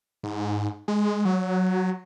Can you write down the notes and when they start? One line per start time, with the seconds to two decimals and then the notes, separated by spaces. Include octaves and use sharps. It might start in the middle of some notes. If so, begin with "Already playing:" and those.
0.23 G#2
0.88 G#3
1.25 F#3